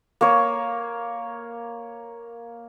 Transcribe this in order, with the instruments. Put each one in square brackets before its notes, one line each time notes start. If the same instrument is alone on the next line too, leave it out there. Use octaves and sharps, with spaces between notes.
[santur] A#3 C#5